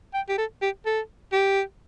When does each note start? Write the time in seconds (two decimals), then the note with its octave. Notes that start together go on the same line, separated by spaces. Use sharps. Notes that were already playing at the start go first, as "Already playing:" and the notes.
0.14 G5
0.29 G4
0.38 A4
0.62 G4
0.86 A4
1.33 G4